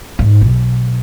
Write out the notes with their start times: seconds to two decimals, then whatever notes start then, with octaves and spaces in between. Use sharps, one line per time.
0.19 G#2
0.41 B1